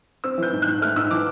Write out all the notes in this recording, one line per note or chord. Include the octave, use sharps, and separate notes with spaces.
C4 E6
E3 G6
G#2
F#6
G#2
A3 F6
G#2 E6
E3 D6